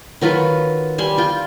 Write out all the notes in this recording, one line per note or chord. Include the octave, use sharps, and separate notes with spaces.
D#3 F#3 F4 B4
G3 G#5 C6
F4 G5